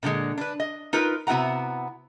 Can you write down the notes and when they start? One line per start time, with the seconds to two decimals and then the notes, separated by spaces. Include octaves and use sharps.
0.03 A#2 D3 F3 G#3
0.38 D4 B4
0.60 D#5
0.93 D#4 F4 A#4 B4
1.27 C3 B3 E4 F#4 F#5 A#5